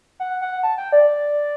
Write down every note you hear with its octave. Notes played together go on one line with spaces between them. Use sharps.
F#5
F#5
A5
G5
D5